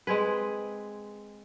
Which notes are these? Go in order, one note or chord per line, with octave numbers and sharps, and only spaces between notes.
G#3 C4 G#4 B4